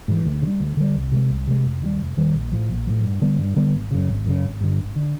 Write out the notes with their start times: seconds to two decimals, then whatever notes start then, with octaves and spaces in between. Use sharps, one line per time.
0.08 G#2 E3
0.25 D2
0.42 D3
0.47 G3
0.60 D2
0.77 D3 G3
0.95 C2
1.12 C3 F3 G#3
1.29 C2
1.47 C3 F3 G#3
1.64 F1
1.82 D#2 D#3 G3
1.99 F1
2.17 D#2 D#3 G3
2.34 A#1
2.52 A2 F3
2.69 A#1
2.87 A2 F3
3.04 G2
3.22 D3 G3 B3
3.38 G2
3.56 D3 G3 B3
3.74 G#1
3.91 F#2 C#3
4.09 G#1
4.26 F#2 C#3
4.43 G#1
4.61 G2 D3
4.78 G#1
4.96 D3